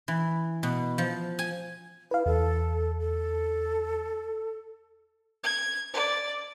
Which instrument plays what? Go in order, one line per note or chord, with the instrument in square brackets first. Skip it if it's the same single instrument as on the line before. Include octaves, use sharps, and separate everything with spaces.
[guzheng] E3
B2
F3
G#5
[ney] E4 [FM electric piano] B4 F5
[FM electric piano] E2 [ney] A4
[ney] A4
[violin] G#6
D5